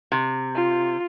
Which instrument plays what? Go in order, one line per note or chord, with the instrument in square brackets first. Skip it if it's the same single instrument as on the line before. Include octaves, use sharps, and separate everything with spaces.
[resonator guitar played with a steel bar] C3
[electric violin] F4